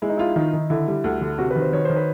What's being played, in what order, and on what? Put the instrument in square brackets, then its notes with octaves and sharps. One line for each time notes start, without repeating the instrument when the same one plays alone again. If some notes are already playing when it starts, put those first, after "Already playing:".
[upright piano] G#3 [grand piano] E4
[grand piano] D#4
[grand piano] E4 [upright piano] F4
[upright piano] D#3 [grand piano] D#4
[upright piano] D#3
[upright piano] D3 [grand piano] E4
[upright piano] G3
D2
D3
[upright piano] C3 [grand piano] F#4
[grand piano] B4
[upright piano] D#3
[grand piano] C5
[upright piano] D#3 [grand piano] C#5
[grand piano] C5
[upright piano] D#3
[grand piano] B4